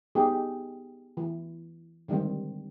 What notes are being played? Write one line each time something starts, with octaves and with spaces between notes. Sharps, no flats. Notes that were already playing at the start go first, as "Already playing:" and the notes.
B3 D#4 G4 G#4
E3
D3 D#3 G3 G#3 C4